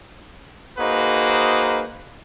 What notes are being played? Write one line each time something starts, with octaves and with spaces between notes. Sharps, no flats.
A#3 D#4 F#4 G#4 B4 C5